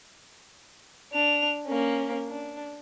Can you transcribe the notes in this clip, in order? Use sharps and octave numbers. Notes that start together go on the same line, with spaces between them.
D4 F7
A#3 C#4
D4